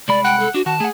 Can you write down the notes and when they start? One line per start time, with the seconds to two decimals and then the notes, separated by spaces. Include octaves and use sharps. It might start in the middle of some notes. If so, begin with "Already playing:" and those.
0.08 C2 G#3 D5 B5
0.24 F#5 G5
0.39 A4
0.54 D4 F#4
0.66 D#3 F#4 A5
0.80 A3 G#4 F#5